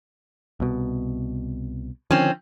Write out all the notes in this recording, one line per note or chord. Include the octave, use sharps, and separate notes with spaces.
C2 B2
D3 D#3 F3 C4 C#4